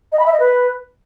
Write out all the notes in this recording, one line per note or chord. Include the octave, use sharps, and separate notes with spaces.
D#5
B5
E5
D#5
B4